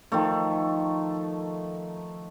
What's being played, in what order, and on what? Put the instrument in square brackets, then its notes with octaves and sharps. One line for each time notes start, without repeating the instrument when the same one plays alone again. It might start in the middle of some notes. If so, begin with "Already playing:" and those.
[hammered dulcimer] D#3 F3 A3